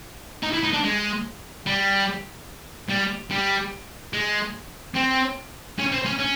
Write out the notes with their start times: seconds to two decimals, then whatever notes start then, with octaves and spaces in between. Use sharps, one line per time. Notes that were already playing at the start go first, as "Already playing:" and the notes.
0.43 D#4
0.53 E4
0.63 D#4
0.73 D4
0.84 G#3
1.66 G3
2.90 G3
3.31 G3
4.13 G#3
4.96 C4
5.79 C#4
5.92 C4
6.05 C#4
6.19 C#4